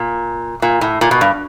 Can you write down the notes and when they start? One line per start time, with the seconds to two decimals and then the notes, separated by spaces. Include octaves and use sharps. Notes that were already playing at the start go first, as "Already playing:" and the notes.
Already playing: A#2
0.62 A#2
0.81 A2
1.01 A#2
1.11 B2
1.21 G2